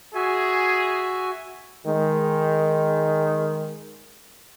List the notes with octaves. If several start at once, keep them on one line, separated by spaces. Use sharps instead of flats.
F#4 G#4 E5 G#5
D#3 G#3